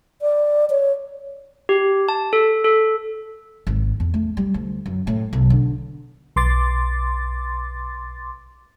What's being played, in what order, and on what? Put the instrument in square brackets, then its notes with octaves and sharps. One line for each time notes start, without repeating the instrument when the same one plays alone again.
[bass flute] D5
C#5
[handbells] G4
A5
A4
A4
[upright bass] G#1
E2
A3
G3
D2
F#2
A2
B1
D3
[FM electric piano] B1 C6 D6 A6